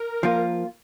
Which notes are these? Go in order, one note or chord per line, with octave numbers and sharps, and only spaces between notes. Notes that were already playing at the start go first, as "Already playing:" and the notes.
Already playing: A#4
F3 A#3 F4